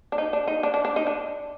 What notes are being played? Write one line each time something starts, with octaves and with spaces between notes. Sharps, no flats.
D4
D#4
D4
D#4
D4
D4
D4
D#4
D4